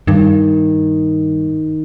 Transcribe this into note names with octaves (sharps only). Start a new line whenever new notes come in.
G2 D#3